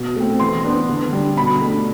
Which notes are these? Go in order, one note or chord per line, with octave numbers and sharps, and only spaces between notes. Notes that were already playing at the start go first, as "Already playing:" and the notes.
Already playing: B2
A3 C4
E3 C6
B3 D4
D3
G3 D4
B2 B5
A3 D4